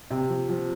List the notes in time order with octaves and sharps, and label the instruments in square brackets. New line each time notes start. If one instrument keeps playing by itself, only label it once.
[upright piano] C3
F3
F3